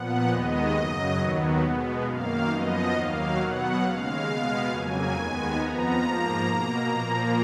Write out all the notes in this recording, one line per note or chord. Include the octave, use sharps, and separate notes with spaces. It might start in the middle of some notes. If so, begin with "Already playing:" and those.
Already playing: A#2 F3 B3 F#5
D#2 D#3 G#3 B3 D#5
F#2 C#3 F#3
D#2 D#3 F#3 B3
B2 G#3 B3
F#2 D#3 A#3 F5
F#2 F3 B3 D#5
D#2 D#3 F#3 A#3 F5
B2 F#3 B3 F#5
D#2 C#3 G#3 F5
B2 G#3 B3
F2 C#3 F#3 A#3 G#5
D#2 D#3 G#3 B3 G#5
F2 F3 B3 A#5
G#2 F3 A#3
B2 A#3
A#2 F3 A#3